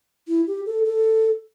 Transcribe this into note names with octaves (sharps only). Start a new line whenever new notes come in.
E4
G4
A4
A4